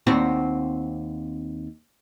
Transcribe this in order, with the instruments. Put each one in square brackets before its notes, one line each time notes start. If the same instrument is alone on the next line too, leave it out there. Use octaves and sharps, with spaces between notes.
[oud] D#2 C4 F#4